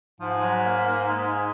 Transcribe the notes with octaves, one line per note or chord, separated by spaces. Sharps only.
G#2 F3
F#3
A#3
A#3
G#3